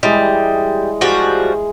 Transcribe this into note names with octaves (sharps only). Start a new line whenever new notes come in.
E3 G3 G#3 D#5
F3 G3 F#4 G#4